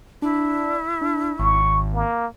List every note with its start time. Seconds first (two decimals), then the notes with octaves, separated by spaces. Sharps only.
0.22 D4 E4
1.01 D4
1.39 G#1 C#6
1.94 A#3